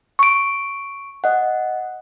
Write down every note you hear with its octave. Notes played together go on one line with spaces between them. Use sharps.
C#6 D7
D#5 F#5